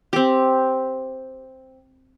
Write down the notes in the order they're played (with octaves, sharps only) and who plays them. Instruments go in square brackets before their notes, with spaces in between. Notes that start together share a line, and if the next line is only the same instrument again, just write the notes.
[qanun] C4 G4